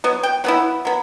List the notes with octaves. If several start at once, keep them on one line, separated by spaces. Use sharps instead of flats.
F#3 B3
G5
F#3 B3 E4 F#5
F#3 B3